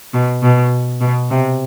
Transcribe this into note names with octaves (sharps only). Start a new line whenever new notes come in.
B2
B2
B2
C3